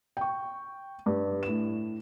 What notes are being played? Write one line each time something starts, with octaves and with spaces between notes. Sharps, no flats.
G5 C#6
G2
A2 E7